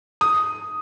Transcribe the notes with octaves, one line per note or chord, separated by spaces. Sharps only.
D#6